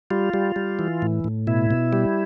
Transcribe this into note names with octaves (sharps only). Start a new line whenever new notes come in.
G3 F4
G3
G3
E3
A2
A2
B2 E4
B2
G3